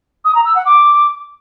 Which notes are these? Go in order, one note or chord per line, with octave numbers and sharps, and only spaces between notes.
D#6
A#5
E6
F#5
D6